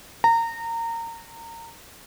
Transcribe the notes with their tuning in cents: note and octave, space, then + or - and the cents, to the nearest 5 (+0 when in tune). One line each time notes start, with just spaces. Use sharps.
A#5 -25